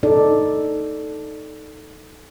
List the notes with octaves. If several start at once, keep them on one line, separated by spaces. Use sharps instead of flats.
D#4 A4 D5